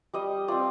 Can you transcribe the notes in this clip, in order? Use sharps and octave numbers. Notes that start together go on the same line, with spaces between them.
G3 D#5
C4 F4 D5